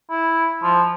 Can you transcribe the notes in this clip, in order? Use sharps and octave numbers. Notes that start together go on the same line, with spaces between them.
E4
F3